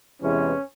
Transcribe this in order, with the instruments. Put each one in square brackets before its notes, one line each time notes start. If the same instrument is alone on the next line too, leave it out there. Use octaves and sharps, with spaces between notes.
[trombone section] E2 C3 E3 G#3 C#4